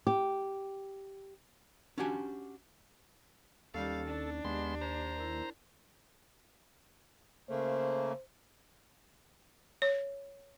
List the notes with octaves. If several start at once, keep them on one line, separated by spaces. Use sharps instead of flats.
G4
C#4 D4 F#4 G4 G#5
D#2 G3 C#4 D#4 A4 F5
D4
D#2 G#3 B3 G4 C6
C5 A#5
E4 A#4
C#3 A3 A#3 C5
C#5